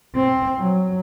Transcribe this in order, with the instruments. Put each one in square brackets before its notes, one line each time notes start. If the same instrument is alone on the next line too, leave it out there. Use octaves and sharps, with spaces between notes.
[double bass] C4
F#3